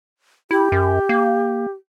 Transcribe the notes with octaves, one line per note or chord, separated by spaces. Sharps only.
E4 G4
F#2
A#3